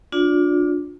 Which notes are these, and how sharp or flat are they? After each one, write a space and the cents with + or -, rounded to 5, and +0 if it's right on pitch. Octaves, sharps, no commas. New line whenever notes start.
D4 +0 F4 +35 D5 -20